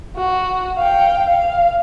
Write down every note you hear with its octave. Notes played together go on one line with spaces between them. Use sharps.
F#4
F5 G5
F5